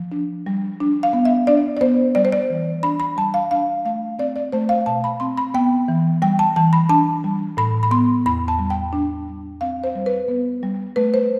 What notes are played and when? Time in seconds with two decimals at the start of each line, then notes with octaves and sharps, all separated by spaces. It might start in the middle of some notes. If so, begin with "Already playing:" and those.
Already playing: F3
0.12 D4
0.46 G3
0.80 D4
1.03 F5
1.13 B3
1.25 E5
1.47 D4 D5
1.77 D5
1.81 B3 C5
2.15 G3 D5
2.25 C5
2.32 D5
2.50 E3
2.83 D4 B5
3.00 B5
3.17 G3 A5
3.34 F5
3.51 D4 F5
3.85 A3 F5
4.19 C4 D5
4.36 D5
4.52 A3 C5
4.69 F5
4.86 B2 A5
5.04 B5
5.20 C4 C6
5.37 B5
5.54 B3 G5
5.88 E3
6.22 G3 G5
6.39 A5
6.56 E3 A5
6.73 B5
6.89 D4 A5
7.24 G3
7.57 A2 B5
7.83 B5
7.91 B3 C6
8.26 E2 B5
8.48 A5
8.59 G3
8.70 G5
8.93 D4
9.28 G3
9.61 C4 F5
9.84 C5
9.96 G3
10.06 B4
10.28 B3
10.63 G3
10.96 A3 B4
11.14 C5